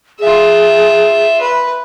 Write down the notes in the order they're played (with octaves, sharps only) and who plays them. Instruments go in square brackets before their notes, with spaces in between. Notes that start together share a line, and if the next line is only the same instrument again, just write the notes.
[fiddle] F4 E5 [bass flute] G#4
[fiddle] B4